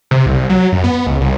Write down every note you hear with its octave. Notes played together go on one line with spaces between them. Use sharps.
C3
C2
F#3
F#2
B3
C#2
C2